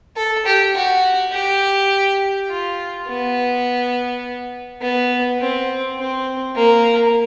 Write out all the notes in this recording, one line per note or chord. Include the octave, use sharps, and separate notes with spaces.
A4
G4
F#4
G4
F4
B3
B3
C4
C4
A#3